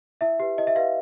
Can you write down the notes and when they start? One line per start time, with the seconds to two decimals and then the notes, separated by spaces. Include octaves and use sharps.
0.21 E4 E5
0.40 G4 B4
0.58 E4 D#5
0.67 E5
0.76 G4 B4 F5